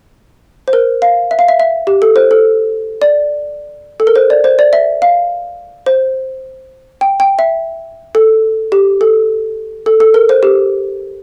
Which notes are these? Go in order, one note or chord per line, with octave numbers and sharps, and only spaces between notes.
C5
A#4
F5
E5
F5
E5
E5
G4
A4
C5
A4
D5
A4
A#4
C5
D5
C5
D5
E5
F5
C5
G5
G5
E5
A4
G4
A4
A4
A4
A#4
C5
G4